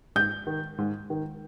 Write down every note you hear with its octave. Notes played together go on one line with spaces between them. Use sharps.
G#2 G6
D#3
G#2
D#3